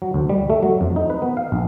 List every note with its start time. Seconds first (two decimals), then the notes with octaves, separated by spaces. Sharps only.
0.02 F#3
0.14 D2
0.29 G3
0.50 A3
0.63 F#3
0.81 F2
0.96 D#4
1.10 B4
1.22 B3
1.37 F5
1.52 A#1